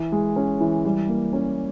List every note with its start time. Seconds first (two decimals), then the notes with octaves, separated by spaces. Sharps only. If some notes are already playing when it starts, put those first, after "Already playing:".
Already playing: E3
0.12 G#3
0.36 C#4
0.60 E3
0.85 G3
1.09 A#3
1.33 C#4